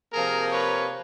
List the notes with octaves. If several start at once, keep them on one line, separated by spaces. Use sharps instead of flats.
C3 F3 A#3 G#4 A#4
B4 C#5